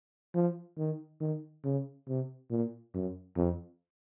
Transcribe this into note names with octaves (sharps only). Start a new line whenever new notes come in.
F3
D#3
D#3
C#3
C3
A#2
F#2
F2